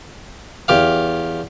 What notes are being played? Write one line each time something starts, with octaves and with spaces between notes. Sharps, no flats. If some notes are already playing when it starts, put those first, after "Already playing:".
E2 G4 F5